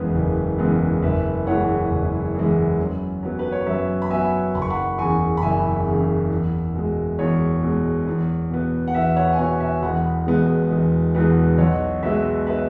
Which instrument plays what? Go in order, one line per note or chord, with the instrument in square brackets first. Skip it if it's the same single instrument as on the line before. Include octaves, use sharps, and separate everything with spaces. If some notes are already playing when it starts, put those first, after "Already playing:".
Already playing: [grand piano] F#1 E2 C#3 G#3 B3 B4
F#1
E2 C#3 G#3 B3
F#1 B4 E5
E2 E3 G#3 C#5 F#5
F#1
E2 E3 G#3
F#2
F#3 B3
B4
C#5
F#2 B4 E5
B5
F#3 B3 E5 G#5
F#1 B5
C#6
F#5 B5
E2 C#3 G#5 C#6
B5
F#1 E5 G#5
E2 C#3
E2
B2 G#3
E2 C#5
B2 G#3
E2
B2 B3
F#5
E2 B4 E5
C#5 F#5
G#5
B2 B3 C#5 F#5
E5 G#5
E1 F#5 B5
E2 B2 G#3 B3
E1
E2 B2 G#3 B3
B1 C#5 F#5
B2 G#3 B4 E5
B4 E5